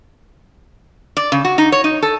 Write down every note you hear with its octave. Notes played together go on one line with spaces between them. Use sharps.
D5
C#3
F#4
D#4
C#5
D#4
A4